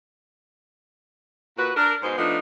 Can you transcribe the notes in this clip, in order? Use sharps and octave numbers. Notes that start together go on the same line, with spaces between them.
A#2 F#4 B4
D4 A#4
G#2 B2 G#4 C5
F3 A3 B3 D4 D#4